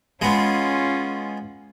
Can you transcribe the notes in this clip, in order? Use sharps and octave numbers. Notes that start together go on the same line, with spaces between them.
G#3 B3 C#4 F4